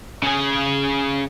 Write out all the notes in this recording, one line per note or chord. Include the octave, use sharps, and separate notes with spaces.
C#3 G#4